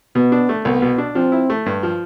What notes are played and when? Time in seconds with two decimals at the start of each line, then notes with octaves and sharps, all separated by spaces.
0.15 B2 B3
0.32 D4
0.49 A3
0.65 C2 B3
0.82 B2
0.98 D4
1.15 F3 C4
1.32 E4
1.50 A3
1.66 G2
1.83 F3